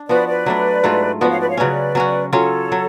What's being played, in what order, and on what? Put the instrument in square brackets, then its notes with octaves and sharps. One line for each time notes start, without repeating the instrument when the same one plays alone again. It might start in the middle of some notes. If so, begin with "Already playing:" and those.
Already playing: [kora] D4
[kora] F3 B3 F#4 [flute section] B4 D5
[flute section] B4 D5
[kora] F#3 A3 D4
G#2 F#3 A3 F4
[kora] F3 B3 F#4 [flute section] B4 D5
[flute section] C#5 F5
B4 D5
C#5 F5
[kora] C#3 F#3 C#4 [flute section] B4 D5
[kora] F#3 C#4 F#4
[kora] F#3 C#4 F4 [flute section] A4 C#5
[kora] F#3